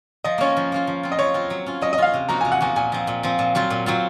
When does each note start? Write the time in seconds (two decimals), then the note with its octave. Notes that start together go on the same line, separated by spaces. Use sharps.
0.24 F3 D#5
0.38 A#3 C#4 F4 C#5
0.57 F3
0.72 A#3 C#4 F4
0.87 F3
1.03 C4 F4
1.12 D#5
1.19 F3 C#5
1.34 C4 F4
1.50 F#3
1.66 C#4 F4
1.82 F#3 D#5
1.93 D#5
1.98 C#4 F4 F5
2.14 C3
2.29 F3 A#3 D#4 F#4 A#5
2.41 C3 G#5
2.52 F#5
2.61 F3 A#3 D#4 F#4 G#5
2.76 A#2 G#5
2.92 F3 C4
3.07 A#2
3.23 F3 C4
3.39 A#2
3.55 F#3 C4 F4
3.70 A#2
3.86 F#3 C4 F4